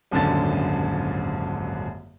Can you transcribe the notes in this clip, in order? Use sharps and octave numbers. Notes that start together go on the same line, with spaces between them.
D#1 G#1 F#2 D3 A5 A6